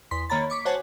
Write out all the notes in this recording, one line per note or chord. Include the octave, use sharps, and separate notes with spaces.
E2 C6 B6
D#3 A#3 C#5 A#5 B5 A6
C#6 D6 B6
F#4 C5 C#5 F#5 G#5 A5